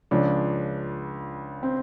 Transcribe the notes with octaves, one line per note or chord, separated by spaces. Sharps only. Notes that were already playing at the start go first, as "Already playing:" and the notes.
C#2 C#3 F3 D4
C4